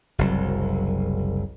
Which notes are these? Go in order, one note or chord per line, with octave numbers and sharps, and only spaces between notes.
F#1 C2 F#3